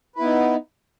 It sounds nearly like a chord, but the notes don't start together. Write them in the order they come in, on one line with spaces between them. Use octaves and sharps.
B4 E4 B3 D#4